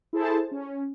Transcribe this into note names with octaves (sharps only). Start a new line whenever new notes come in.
E4 G#4 A4 C5 A5
C#4